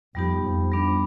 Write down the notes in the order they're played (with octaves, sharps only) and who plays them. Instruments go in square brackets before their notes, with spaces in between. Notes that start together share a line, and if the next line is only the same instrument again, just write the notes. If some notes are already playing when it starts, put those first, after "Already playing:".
[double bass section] F2 [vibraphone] G3 B3 D#4 G4
[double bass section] F2
[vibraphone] G3 B3 D4